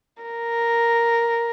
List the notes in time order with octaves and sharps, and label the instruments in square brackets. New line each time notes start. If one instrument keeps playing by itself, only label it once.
[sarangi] A#4